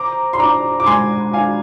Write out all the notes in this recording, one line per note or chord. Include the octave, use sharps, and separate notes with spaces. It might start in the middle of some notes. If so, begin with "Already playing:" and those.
Already playing: C5 A#5 D6
C6
D4 A#5 D6
D6
G#3 G#5 C6
D4 F5 G#5